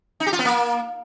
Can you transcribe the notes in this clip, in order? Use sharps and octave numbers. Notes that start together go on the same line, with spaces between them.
D#4
G4
F4
B3
A#3